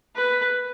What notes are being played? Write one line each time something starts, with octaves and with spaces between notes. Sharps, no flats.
B4